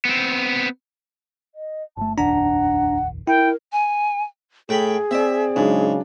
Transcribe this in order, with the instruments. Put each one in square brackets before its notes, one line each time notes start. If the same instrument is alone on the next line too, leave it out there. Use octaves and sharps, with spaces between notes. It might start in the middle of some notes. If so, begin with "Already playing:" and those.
[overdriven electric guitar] B3 C4
[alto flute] D#5
[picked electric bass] G1 A3 [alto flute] A5
[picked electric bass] F1 A#1 D#2 [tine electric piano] D4 A#5 [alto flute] F#5
[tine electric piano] E4 [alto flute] A#4 [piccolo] G5
[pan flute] G#5
[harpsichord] A2 G5 B5 [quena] G#4
[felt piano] C4 D5 [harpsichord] E5
[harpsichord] G#2 [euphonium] C#3 [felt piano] F#3 D4